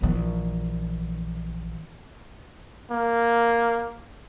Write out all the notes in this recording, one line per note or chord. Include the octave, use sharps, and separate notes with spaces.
A#1 E3
A#3